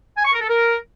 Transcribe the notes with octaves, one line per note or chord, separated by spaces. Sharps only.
G#5
C#6
A#4
A4
A#4